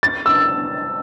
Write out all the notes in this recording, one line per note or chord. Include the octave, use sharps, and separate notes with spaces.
A6
E6